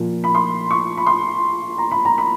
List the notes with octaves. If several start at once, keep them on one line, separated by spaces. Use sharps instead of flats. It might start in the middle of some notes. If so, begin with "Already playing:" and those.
Already playing: A#2 F3
B5
C6
C#6
B5
C6
A#5
B5
A#5
B5